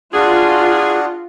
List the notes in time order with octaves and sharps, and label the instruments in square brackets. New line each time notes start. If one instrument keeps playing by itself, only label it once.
[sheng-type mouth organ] D4 F#4 [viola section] F4 [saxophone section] G#4